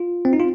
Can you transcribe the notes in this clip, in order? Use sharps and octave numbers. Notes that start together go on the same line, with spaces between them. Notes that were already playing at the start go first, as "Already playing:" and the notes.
Already playing: F4
C4
D#4
F4